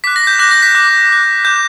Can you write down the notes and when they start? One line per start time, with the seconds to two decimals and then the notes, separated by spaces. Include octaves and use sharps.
0.04 D6 F#6 B6
0.16 A#6
0.27 G6
0.39 D6 F#6 A#6
0.51 A#6
0.62 B6
0.75 D6 F#6
1.09 D6 F#6
1.44 D6 F#6 G6